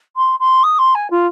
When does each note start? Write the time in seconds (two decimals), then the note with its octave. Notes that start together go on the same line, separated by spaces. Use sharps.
0.16 C6
0.39 C6
0.63 D#6
0.78 C6
0.95 G#5
1.10 F4